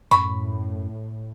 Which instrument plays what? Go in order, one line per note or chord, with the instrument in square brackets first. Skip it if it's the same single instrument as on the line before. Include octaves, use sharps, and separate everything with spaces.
[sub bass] F#2 [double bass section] A2 [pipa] B5 [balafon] C#6